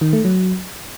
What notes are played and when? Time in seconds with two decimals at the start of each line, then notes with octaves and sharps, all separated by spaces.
0.01 D#3
0.13 A3
0.25 F#3